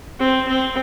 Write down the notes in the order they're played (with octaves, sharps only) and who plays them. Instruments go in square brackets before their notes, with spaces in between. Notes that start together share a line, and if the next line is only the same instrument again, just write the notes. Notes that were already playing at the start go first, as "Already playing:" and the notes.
[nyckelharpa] C4
C4